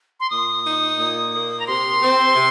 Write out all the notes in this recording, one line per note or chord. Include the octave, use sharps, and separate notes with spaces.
C6
A#2 D#6
D#4
A#2
A#3
A#5
C3 C6
C4
C3